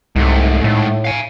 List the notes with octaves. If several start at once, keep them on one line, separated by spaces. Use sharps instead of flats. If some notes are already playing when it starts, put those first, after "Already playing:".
C2 G#2 A3
A2
F5 G#5